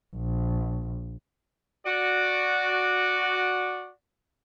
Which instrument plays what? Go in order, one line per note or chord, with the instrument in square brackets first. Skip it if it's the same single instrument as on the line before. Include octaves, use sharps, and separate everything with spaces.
[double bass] A#1
[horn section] F#4 D5